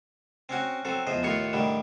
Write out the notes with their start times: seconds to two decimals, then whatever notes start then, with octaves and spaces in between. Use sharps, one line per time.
0.49 C4 C#4 F#4
0.85 F#3 C4 A4
1.07 E2 F3 C5 D#5
1.23 D#2 A2 F4 C#5 C#6
1.53 A2 D3 D#3 G3